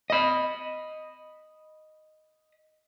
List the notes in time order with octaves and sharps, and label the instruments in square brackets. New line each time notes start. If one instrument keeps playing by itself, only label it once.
[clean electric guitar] D#5 B5